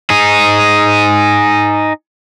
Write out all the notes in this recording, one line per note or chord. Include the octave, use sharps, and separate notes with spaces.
D#4 G#4